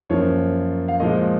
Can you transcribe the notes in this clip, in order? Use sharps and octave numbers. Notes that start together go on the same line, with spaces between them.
F#2 F3 A#3 C#5
F5
A#2 F3 G#3 D#5